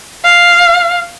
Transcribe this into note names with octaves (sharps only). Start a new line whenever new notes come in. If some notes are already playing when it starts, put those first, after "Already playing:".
F5